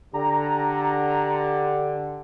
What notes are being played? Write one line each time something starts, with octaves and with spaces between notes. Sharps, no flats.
D3 G4 A#5